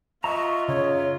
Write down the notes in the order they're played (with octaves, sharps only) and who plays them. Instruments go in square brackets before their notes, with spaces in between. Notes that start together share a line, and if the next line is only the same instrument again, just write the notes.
[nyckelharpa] F4 [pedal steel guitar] D#5 E5 A#5 [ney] C#6
[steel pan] C#3 [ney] C#5